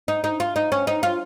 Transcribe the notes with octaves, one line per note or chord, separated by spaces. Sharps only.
D#4
D#4
F4
D#4
C#4
D#4
F4